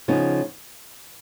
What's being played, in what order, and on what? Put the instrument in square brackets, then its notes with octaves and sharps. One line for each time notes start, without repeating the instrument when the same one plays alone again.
[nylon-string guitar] C#3 F3 B3 D#4